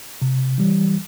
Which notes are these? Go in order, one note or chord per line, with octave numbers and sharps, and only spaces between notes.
C3
E3 G3